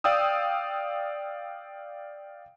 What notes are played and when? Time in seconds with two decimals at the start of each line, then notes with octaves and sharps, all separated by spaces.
0.04 D5 F5 G5 D#6 E6